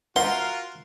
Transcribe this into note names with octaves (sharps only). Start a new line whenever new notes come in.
F3 F4 F#4 A#4 E5 F#5 C6